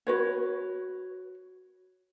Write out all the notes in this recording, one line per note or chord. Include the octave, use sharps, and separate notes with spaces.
F#4 B4 C#5